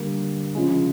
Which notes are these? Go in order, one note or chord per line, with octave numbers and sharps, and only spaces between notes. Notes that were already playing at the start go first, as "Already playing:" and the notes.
Already playing: D3 G3 A#3
C#3 F3 G#3